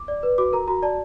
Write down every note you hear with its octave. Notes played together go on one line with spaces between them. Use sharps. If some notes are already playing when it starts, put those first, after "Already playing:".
Already playing: D6
D5
B4
F#4 D6
A#4 A#5
F#4 A#5
D5 A5